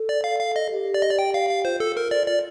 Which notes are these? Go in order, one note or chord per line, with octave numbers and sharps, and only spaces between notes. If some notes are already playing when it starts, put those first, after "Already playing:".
Already playing: A4
D5
F5
F5
D#5
G4
D5
D#5
D5
G5
F5
F5
F4 C5
A4
A#4
D5
D5